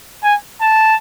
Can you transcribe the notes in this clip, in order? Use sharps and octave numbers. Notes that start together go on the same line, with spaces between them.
G#5
A5